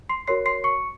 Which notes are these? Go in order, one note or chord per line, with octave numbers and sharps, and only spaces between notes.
C6 C7
F#4 A#4 C#5 C6 C7
C6 C7
C#6 C#7